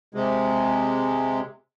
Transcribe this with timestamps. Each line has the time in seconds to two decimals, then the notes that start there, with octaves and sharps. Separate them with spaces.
0.14 C3 G#3